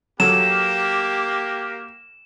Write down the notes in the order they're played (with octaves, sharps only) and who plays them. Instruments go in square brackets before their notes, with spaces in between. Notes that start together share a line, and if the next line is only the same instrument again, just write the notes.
[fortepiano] F#3 A4 [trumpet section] A#3 G4 [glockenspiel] E7